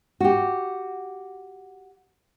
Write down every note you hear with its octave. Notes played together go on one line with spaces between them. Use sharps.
F#4 G4